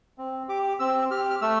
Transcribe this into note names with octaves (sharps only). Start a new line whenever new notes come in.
C4
G4 D6
C4 E6
G4 F6
F6
A3 E6